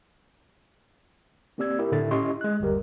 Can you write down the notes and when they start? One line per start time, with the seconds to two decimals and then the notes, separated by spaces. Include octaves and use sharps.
1.58 A#3 C4 G4 D5 E6 G#6
1.79 E4 G4 A#4
1.92 A2 D3 E4 A4 E5 A6
2.11 C#4 E4 G4 D#5 C6 C#6
2.41 G#3 F#6
2.60 G1 D#2 G3 G4 A#4